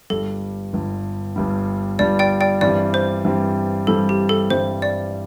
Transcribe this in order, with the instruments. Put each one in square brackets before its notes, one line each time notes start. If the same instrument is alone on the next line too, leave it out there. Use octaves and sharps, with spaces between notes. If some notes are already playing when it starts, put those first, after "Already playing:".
[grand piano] G1 G2 G3 [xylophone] A4
[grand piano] G1 G2 G3
G1 G2 G3
[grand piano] G1 G2 G3 [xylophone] D5
[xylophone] D5 G5
D5 G5
[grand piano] G2 E3 G3 C4 [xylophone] D5
[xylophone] C5
[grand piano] G2 E3 G3 C4
[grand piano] G2 E3 G3 C4 [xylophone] A4
[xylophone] G4
A4
[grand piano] G2 E3 G3 C4 [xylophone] C5
[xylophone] D5